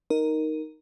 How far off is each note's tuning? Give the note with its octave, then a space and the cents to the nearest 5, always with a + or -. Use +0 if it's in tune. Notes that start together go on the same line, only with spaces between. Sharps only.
D#4 +0 A#4 +0